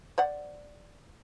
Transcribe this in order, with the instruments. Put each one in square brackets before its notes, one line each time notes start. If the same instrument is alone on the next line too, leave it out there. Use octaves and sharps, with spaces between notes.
[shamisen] C5 D5 F#5